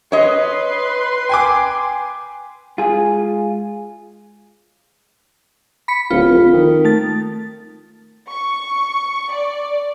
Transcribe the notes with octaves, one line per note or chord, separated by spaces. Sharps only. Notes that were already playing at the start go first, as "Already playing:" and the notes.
B4 C#5 D#5 C6
G5 G#5 D6
G#3 F4 G#4
B5 B6 C#7
D1 F4
F2
D#3
A3 A6
C#6
D5